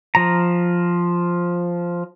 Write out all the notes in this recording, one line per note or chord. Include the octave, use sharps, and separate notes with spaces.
F3 A#5